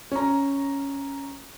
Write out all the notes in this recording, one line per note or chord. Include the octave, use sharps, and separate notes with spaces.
C#4 A#5